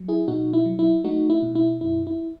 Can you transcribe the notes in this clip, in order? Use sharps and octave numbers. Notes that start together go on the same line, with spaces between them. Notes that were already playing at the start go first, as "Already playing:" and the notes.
Already playing: F#3
E4 G#4
B2 D#4 F#4
E4
F#3
E4
A3 D#4 F#4
E4
B2
E4
F#2 E4
E4